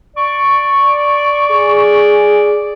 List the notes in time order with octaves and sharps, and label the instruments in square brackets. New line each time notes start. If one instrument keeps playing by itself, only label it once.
[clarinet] D5 [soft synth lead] C#6
[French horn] G#4